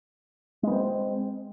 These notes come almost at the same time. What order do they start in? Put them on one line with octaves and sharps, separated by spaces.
G#3 B3 C4